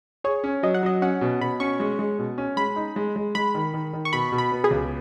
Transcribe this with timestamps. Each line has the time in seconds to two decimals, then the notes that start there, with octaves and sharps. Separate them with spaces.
0.24 G#4 C#5
0.44 C#4
0.63 F#3 D#5
0.74 F#5
0.83 F#3 D#5
1.02 C#4 F#5
1.21 B2
1.41 B2 B5
1.60 C#4 C#6
1.80 G#3
1.99 G#3
2.19 B2
2.38 C#4
2.57 G#3 B5
2.76 D#4
2.96 G#3
3.16 G#3
3.35 G#3 B5
3.54 D#3
3.74 D#3
3.93 D#3
4.05 C#6
4.13 B2 B5
4.32 B2
4.38 B5
4.52 B3
4.64 G#4
4.71 C#2